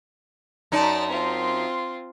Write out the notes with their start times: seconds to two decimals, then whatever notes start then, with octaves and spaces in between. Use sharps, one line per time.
0.72 F#2 D#4 D5 A5
1.10 C4 F4